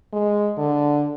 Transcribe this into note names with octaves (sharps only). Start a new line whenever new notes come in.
G#3
D3